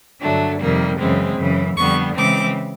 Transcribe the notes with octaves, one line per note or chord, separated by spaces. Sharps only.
G2 D3 F#3 A3 D4
F2 C3 D#3 G3 A#3
F#2 C#3 E3 G#3 C4
F#2 C#3 E3
F2 D3 G3 B3 C#6
C#3 E3 G#3 C4 D6